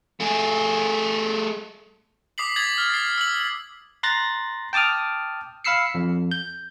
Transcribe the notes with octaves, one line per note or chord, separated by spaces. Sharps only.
A3 G#4
D6 D#6 B6 C7 F#7
G#6 A6 B6 F#7
F6
A6 C7
E6 F#7
A#5 C6 F#6 A6 A#6
G5 A5 D6 D#6 F6
F5 B5 E6 C7 C#7
F2
G6